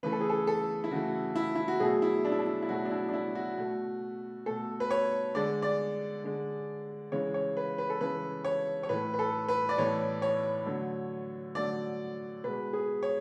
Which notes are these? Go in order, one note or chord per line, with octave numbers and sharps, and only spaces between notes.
C#3 E3 A3 B4
A4
G#4
A4
A4
E4
C#3 E3 A3 F#4
E4
E4
F#4
B2 F#3 A3 G#4
E4
D4
E4
D4
E4
E4
B2 F#3 A3 F#4
D4
E4
D4
E4
F#4
B2 A3
B2 A3 A4
B4
C#5
D3 G#3 D5
D5
D3 G#3
C#3 E3 G#3 C#5
C#5
B4
B4
A4
C#3 E3 G#3 B4
C#5
C#5
A2 E3 A3 B4
B4
A4
B4
D5
A2 E3 A3 C#5
C#5
D3 F#3 A3
D3 F#3 A3 D5
B2 G#3 B4
G#4
C#5